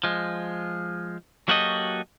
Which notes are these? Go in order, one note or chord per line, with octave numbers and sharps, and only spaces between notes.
F3 G#3
F#3 A#3 F#4 G4 A4 D#5